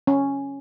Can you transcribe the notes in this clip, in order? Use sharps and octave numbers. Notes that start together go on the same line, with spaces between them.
C#4